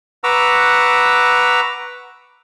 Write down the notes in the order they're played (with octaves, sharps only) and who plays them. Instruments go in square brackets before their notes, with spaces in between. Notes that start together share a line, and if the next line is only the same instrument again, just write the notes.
[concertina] B4 F#5 A#5 C#6 D6 E6